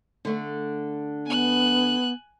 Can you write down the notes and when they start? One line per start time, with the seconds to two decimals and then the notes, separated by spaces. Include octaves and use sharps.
0.25 D3 A3
1.26 B3 G#5 F#6